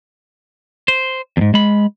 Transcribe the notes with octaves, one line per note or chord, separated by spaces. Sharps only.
C5
E2 G#2
G#3 B5